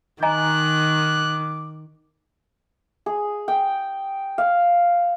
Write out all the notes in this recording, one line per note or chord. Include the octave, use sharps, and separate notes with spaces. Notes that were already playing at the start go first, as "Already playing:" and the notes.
D#3 D#5 G#5 A#5 D6 F#6
G#4
G5
F5